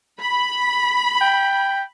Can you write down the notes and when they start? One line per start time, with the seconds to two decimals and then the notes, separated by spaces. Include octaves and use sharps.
0.19 B5
1.21 G5